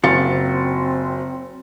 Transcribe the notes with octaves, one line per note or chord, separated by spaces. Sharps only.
F#1 C4 F4 F#4 F5 A6 C#7